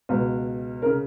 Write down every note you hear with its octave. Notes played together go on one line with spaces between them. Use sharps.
C#2 B2
A#4
C#3